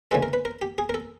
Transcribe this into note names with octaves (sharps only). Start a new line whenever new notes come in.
D2 C#3 E3 G#3 A4
A#4
B4
A#4
G4
G#4
A#4
A4